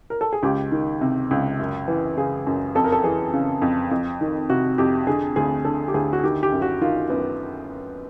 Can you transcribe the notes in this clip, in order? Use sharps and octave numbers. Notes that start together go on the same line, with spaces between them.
A#4
A4
G#4
C#2 G4
D#3
C3
C#2
F#2
E3
C#3 G#4
F#2
F2 A4
A#4
A4
E3 G#4
C#3
F2
F2
D#3
C3 F#4
F2 G4
D3 G#4
D2 G#4
D3 A4
G4
D2 G#4
F#4
D#3 G4
G4
F#2
F#4
D#3 F4
F#2 B3